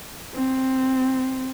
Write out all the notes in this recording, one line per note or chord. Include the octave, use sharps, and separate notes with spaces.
C4